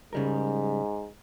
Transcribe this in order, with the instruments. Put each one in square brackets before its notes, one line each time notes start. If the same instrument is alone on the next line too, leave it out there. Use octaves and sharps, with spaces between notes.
[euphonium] G#2 [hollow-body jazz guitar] C#3 G3 A#4